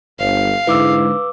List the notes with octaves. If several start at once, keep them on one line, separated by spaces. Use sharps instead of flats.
G1 F5
G#2 D3 G#3 E4 B4 D6 E6